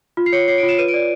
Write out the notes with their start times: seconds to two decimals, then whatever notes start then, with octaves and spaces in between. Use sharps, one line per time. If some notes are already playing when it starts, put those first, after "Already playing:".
0.17 F4
0.26 C7
0.33 C#5 C#7
0.48 C#5 C7
0.58 D7
0.63 F4
0.69 E7
0.78 B4 D#7
0.88 D7
0.94 D5